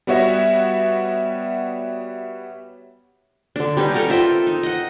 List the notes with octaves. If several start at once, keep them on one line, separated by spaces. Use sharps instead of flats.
G3 B3 F#4 C#5 E5 A#6
D3 D4
G3 C#4 D#4 B4
A4 A#4 D5 F#5
C4 F4 E5 G5
D#4
D#5 F#5